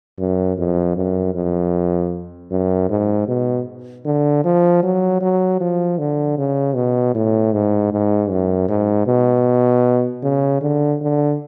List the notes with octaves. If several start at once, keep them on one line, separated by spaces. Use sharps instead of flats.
F#2
F2
F#2
F2
F#2
G#2
B2
D3
F3
F#3
F#3
F3
D3
C#3
B2
A2
G#2
G#2
F#2
G#2
B2
C#3
D3
D3